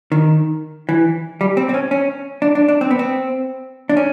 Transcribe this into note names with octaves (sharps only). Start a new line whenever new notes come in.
D#3
E3
G3
C4
C4
C#4
C#4
D4
D4
D4
C4
B3
C4
D4
C#4